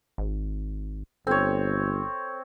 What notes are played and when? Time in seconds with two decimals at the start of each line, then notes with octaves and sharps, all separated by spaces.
0.18 G#1
1.27 G1 C4 A4 C#5